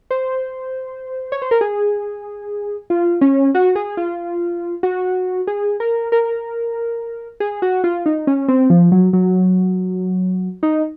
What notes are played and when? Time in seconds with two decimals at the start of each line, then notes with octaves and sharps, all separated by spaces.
0.11 C5
1.32 C#5
1.42 C5
1.51 A#4
1.61 G#4
2.90 F4
3.21 C#4
3.55 F#4
3.75 G#4
3.97 F4
4.83 F#4
5.47 G#4
5.80 A#4
6.12 A#4
7.40 G#4
7.62 F#4
7.84 F4
8.06 D#4
8.27 C#4
8.48 C4
8.70 F3
8.92 F#3
9.13 F#3
10.63 D#4